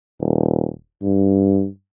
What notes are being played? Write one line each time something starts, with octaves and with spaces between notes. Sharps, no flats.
D#1
G2